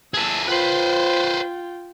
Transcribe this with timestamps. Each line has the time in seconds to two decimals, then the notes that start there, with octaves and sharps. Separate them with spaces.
0.14 G#4 B4 A5 E6
0.48 F4 B4 C5 G5